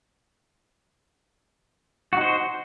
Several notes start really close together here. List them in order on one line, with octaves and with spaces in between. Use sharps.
F#4 D#4 C5